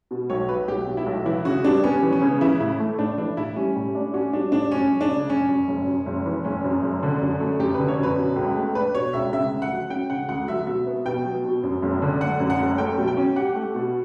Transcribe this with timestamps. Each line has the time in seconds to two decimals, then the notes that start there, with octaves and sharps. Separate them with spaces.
0.11 B2
0.30 B1 C#5
0.49 F#3 B4
0.68 B1 G4
0.87 B2
0.97 E4
1.06 B1
1.26 E3 E4
1.45 C#3 F#4
1.64 G3 D4
1.84 B3 C#4
2.02 E3
2.13 C#4
2.22 C#3
2.41 E3 E4
2.60 A2 E4
2.80 A3
2.98 A2 D4
3.18 E3 D4
3.37 A2 E4
3.56 G3 C#4
3.76 A2
3.95 D4
4.14 C#4 F#4
4.33 G3 D4
4.52 A2 D4
4.72 F#2 C#4
4.91 F#1
5.01 D4
5.10 C#3
5.30 F#1 C#4
5.49 F#2
5.68 F#1
5.87 F#2
6.06 F#1
6.26 E3
6.44 F#1 C#4
6.64 F#2
6.82 F#1
7.03 D3
7.21 F#2
7.40 A3
7.59 F#2 G4
7.74 B4
7.79 D3
7.88 C#5
7.99 F#2 B4
8.18 B2
8.36 C#2
8.56 A3
8.75 D4 B4
8.94 B2 C#5
9.13 C#2 E5
9.33 C#3 E5
9.51 D2
9.62 F#5
9.72 F#3
9.90 C#4 G5
10.10 C#3 F#5
10.29 D2 F#5
10.48 F#3 E5
10.67 B2 E5
10.86 B3
11.05 B2 G5
11.25 F#3
11.45 B2
11.63 F#2
11.82 F#1
12.02 D3
12.21 A3 F#5
12.40 F#2
12.50 F#5
12.59 F#1
12.78 A3 G5
12.98 B2
13.08 G5
13.17 C#4
13.36 G4 F#5
13.55 A3
13.75 B2